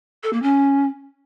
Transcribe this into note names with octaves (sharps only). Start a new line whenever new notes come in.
A4
A#3
C#4